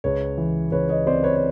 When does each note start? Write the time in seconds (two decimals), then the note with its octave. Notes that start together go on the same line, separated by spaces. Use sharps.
0.04 C#2 B4 C#5
0.38 E3
0.72 C#2 B4 C#5
0.89 C#5 D#5
1.06 C3 C5 D5
1.23 B4 C#5
1.36 C#5